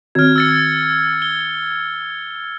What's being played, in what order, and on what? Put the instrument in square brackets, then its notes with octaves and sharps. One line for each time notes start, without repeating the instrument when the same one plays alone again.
[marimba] D#3 C4 F#4 [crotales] F6 G#6
[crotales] E6 A6 C#7
G7